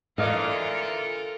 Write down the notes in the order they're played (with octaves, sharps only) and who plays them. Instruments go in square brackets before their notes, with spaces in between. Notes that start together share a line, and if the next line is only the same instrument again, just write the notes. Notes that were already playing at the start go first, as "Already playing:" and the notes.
[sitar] D3 E3 D5 [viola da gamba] F4 A4 A#4 [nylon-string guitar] D#5 F5